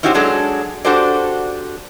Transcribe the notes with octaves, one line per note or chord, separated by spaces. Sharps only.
C#4 D#4 E4 F#4 G4 C5
F#3 G#3 D4 G#4 A4
D4 F#4 G4 A4 C5 D5